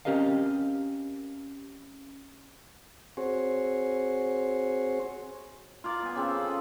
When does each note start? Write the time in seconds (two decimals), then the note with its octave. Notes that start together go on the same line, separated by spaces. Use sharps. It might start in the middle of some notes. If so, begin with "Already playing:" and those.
0.05 C4 C#4 G4 A#4 D#5 F5
3.17 C4 F#4 G#4 C5 C#5
5.84 F4 A#4 D5
6.03 B3 G#5
6.16 C#3 C4 A4
6.31 D#5 B5